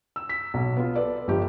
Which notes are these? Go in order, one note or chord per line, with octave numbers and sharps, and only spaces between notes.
E6
B6
B1
B3 F4
A4 B4 D5
G1 F3 G4